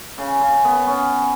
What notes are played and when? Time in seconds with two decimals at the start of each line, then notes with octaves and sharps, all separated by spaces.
0.18 C#3
0.41 C#3
0.65 B3
0.87 C#4